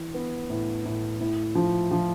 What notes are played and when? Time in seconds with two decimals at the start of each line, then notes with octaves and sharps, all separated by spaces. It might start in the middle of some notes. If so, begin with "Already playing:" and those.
Already playing: E3
0.14 B3
0.50 A2
0.85 A2
1.21 A2
1.55 F3
1.91 F3